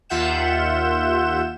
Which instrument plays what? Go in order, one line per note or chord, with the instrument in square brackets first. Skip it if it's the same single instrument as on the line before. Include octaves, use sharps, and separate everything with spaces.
[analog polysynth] D#2 F4 E5 F#5 G6 E7